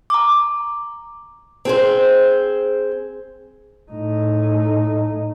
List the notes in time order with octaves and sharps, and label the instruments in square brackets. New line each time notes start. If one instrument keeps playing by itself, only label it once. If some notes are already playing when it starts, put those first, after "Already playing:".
[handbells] A#5 D6
[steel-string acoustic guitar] C4 G#4 C5
[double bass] A2 D#4